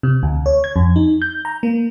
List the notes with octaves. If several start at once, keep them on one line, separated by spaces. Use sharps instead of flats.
C3
D2
C#5
G#6
F2
D#4
G6
A#5
A#3